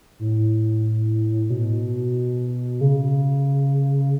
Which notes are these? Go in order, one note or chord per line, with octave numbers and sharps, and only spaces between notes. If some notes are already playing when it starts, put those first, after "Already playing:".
A2
B2
C#3